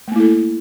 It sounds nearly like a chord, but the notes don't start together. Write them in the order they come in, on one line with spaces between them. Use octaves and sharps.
A3 A#3 E4 A4